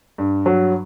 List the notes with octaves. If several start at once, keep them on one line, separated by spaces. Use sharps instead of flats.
G2
F#3